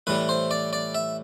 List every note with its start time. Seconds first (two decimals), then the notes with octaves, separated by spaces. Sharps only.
0.07 A2 E3 G3 B4
0.29 C5
0.51 D5
0.73 D5
0.95 E5